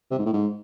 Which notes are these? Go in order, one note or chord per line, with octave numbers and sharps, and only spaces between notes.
C3
G#2
A2
G#2